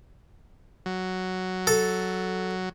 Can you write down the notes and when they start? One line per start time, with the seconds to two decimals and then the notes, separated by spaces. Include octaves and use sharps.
0.86 F#3
1.67 A4